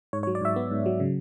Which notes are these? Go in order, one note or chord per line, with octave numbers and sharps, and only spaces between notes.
G#2 C#5
C#5
F#3
D5
G#2 E5
B3
G#2
F#3
C#3